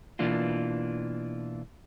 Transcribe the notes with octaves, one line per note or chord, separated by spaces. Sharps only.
B2 E3 A#3 D4 F4